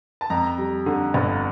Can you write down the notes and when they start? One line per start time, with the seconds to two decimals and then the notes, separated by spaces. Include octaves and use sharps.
0.21 A5
0.30 F2 A#5
0.58 G3
0.86 D3
1.14 G1